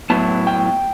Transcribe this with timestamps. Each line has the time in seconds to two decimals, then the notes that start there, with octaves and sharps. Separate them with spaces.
0.10 A2 F#3 B3 E4 A5
0.47 G5